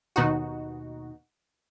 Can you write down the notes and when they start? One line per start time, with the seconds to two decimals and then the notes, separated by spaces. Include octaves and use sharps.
0.16 D#2 B2 D#4 F#4